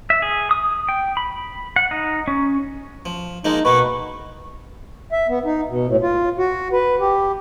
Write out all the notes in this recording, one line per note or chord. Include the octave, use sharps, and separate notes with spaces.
E5
G#4
D#6
G5
B5
F#5
D#4
C#4
F3
F3 G#3 A#3 D#4
B2 A#3 B4 C#6
E5
B3
D#4
B2
A2
F4
F#4
B4
G4